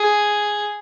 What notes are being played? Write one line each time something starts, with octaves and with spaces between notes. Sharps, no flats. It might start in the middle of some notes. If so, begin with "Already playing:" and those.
Already playing: G#4